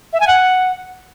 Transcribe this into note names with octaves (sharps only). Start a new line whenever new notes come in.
E5
G#5
F#5